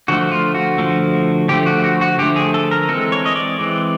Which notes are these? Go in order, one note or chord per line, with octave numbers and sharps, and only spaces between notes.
D3 F3 A3 F#4
F4
F#4
D3 F3 A3
D3 F3 A3 G4
F#4
F#4
F#4
D3 F3 A3 G4
G#4
A4
A#4
E3 G#3 C4 A4
C#5
D#5
D5
E3 G#3 C4